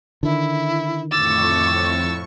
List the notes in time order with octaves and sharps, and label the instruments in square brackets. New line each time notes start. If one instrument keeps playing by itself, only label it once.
[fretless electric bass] D3 D#3 [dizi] E4
[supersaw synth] F2 A2 C#6 [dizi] D6 [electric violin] E6 A6